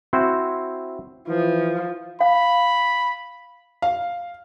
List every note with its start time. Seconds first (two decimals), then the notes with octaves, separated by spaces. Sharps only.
0.13 C4 E4 F#4 C5
1.28 E3 F3
2.21 F5 B5
3.82 F5